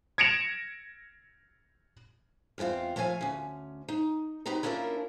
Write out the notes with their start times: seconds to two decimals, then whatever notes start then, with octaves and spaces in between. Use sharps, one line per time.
0.18 G#6 A#6 C#7 D7 E7 F7
2.58 E2 G#3 C4 F4 F5
2.96 F3 A3 C#5 F5 G#5
3.21 D2 C#4
3.88 D#4
4.46 F#3 B3 C4 D#4 G4 A#5
4.63 A#3 C#4 D4 E4 F4 A#4